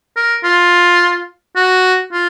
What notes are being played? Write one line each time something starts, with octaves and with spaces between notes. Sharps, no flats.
A#4
F4
F#4
F4